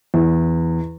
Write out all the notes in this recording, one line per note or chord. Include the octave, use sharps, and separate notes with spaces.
E2